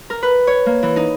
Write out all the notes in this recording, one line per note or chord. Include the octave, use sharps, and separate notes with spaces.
A#4
B4
C#5
A#3
E3
D#4